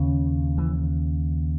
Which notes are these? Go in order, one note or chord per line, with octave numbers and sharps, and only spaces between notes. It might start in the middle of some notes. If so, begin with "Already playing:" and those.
Already playing: D#2 C#3 C#4
E3